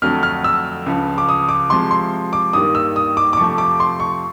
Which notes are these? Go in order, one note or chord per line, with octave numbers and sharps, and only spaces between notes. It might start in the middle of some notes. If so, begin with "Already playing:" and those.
F2 D3 F#3 A3 F6
F6
E6
C#2 C#3 F3
D6
D#6
D6
C2 C3 F3 G#3 C6
C6
D6
G2 D#3 G3 A#3 D#6
E6
D#6
D6
D6
F2 C3 F3 A3 C#6
D6
C6
C#6